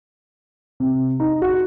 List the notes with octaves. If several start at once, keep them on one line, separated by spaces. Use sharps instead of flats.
C3
D#4
F#4